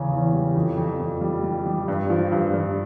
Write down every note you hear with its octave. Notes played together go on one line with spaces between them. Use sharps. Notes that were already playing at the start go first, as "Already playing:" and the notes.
Already playing: E2 C#3 C#4
E2
G3
F2
F2
F2
G3
G3
G3
G2
F3
G2
G2